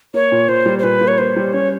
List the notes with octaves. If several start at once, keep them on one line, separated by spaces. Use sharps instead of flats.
A#3 C#5
A#2
A#2 C5
G3
C5
A#2 B4
A#3
C#5
A#3 C5
G3
C#4 C#5